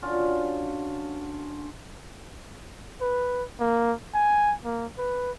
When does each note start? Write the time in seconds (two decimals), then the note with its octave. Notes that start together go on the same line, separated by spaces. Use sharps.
0.02 D3 C#4 F4 F#4
3.01 B4
3.60 A#3
4.14 G#5
4.65 A#3
4.98 B4